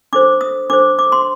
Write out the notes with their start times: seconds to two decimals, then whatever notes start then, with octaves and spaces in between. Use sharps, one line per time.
0.13 D4 A4 C5 D6
0.41 D#6
0.70 D4 A4 C5 D6
0.99 D6
1.12 C6